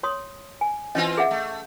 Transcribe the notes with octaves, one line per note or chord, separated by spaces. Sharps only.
C#5 C6 D#6
G#5
E3 C4 C#4 F4 D#5
G#4 E5 F#5
A3